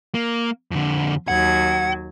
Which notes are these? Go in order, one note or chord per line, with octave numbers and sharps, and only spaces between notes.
A#3
F2 D3
D#2 F#3 F#5 G#6